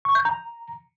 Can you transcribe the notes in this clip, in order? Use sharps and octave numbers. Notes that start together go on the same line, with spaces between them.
C#6
G6
A#5